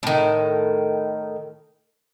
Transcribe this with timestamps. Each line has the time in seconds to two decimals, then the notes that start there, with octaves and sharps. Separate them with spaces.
0.03 A2 D#3